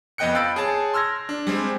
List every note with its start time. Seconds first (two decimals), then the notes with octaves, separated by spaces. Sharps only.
0.18 F2 B3 D#5 G5 F#6 C#7
0.35 F5 B5 E6 G6 A6 D7
0.56 G#4 C#5 A5
0.93 C6 E6 F6 G#6 A#6
1.29 D4
1.47 G3 G#3 C4